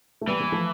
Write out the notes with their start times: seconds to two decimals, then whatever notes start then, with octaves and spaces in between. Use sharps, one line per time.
0.21 A3
0.27 E3 G3 B3
0.40 G3 B3
0.52 F3 A3